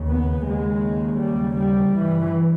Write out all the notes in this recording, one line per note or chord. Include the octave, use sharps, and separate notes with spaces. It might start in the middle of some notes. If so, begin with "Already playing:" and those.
Already playing: D#2 C#3
B3
D#2 C#3 G#3
G3
G3
G2 E3